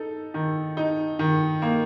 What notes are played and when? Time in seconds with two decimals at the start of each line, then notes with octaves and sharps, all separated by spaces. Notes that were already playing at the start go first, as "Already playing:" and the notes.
Already playing: D#4 A4
0.34 D#3
0.77 D#4
1.19 D#3
1.62 A#3